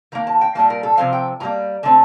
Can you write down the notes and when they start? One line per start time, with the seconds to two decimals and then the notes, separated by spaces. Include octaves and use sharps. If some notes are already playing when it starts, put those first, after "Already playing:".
0.12 D#3 A#3 A#5
0.27 A5
0.41 G5
0.55 A#2 G3 A#3 A5
0.70 A#4
0.83 A4
0.97 C3 F3 C4 F5
1.12 G5
1.40 A#2 G3 A#3 A#5
1.83 D3 A3 C4 A5